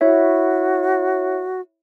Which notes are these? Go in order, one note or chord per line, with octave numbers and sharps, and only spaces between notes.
E4 F#4 C#5 E5